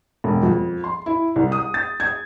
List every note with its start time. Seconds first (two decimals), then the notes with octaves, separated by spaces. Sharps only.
0.24 E1
0.43 F2
0.84 C6
1.06 E4
1.36 C2
1.52 D#6
1.74 A6
2.00 G#6